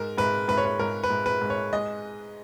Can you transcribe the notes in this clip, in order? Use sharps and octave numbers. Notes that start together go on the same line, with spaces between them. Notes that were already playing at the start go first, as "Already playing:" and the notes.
Already playing: G#2 A#4
G#2 B4
G#2 B4
C#5
B4
G#2 A#4
B4
G#2
B4
G#2
C#5
G#3 D#5